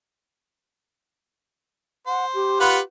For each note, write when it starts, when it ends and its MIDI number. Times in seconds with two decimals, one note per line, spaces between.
2.07 2.58 72
2.07 2.25 78
2.34 2.81 67
2.60 2.78 65
2.60 2.78 71
2.60 2.78 78